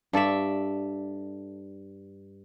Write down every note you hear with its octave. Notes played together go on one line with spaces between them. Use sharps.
G2 A4 D5 E5